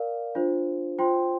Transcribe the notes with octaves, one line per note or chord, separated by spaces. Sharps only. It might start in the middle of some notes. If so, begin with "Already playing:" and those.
Already playing: A#4 D5 F5
D4 F4 C5
F4 C5 G5 C6